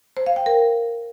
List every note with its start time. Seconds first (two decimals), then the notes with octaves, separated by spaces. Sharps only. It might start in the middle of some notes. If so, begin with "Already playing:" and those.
0.17 C5
0.26 F5
0.36 G5
0.46 A#4